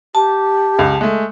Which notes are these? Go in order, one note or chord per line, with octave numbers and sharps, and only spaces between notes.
G4 A5
C#2
G#3 A3